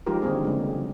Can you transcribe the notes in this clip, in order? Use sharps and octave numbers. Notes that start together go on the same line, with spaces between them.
F3 G#3 D#4 F4 G4 A#4
D3 D#3 G3 A#3 C4 G#4
C#3 G#3
F#3